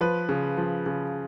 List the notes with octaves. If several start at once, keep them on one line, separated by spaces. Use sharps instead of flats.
F3 B4
C#3
F3
C#3